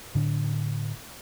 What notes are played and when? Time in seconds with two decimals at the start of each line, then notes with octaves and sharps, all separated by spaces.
0.15 A2 D3 D4